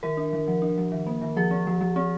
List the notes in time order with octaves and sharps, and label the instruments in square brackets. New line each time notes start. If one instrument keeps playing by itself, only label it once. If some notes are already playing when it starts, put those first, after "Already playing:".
[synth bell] D#3 A#4
D4
D#3
F3
D4
F3
D#3
A#3
D#3
F3 G#4
C4
F3
F3
C4